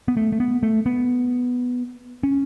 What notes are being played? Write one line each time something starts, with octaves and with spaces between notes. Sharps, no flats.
B3
A3
A3
B3
A3
B3
C#4